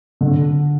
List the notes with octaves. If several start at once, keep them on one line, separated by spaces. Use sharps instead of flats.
D3